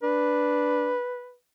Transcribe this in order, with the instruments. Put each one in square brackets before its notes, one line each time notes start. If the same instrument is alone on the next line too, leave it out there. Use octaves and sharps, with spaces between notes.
[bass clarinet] D4 [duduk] B4